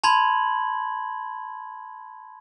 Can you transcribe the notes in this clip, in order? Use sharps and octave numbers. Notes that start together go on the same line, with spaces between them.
A5 B5 C6 G#6 F#7